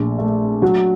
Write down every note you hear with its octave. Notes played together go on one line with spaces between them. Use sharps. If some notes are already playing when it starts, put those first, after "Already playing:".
Already playing: A#1 A3
A3
F#3